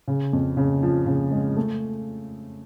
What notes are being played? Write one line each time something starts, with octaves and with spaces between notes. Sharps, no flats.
C#3
F2
C#3
F3
C#3
G#3
A3